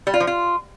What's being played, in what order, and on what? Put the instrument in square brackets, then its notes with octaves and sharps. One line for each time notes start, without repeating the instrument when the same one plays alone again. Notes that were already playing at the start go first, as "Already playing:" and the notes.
[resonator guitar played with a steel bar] G3
F4
F3
F4